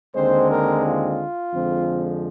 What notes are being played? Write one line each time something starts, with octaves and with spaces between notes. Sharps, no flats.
D#2 D3 G#3 C4 C5
A#4
F4
F2 D3 F3 G#3 C4